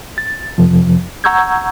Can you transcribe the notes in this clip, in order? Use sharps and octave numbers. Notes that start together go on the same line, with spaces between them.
A6
F2 C3 F3
F#5 A#5 C#6 E6 G6 G#6